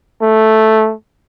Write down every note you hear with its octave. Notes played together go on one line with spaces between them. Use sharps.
A3